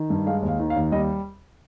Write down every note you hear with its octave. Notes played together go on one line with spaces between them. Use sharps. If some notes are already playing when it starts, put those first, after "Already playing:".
Already playing: D#3
G2
G#3 F5
D#2
F5
D#3
F5
D#2
G3 D#5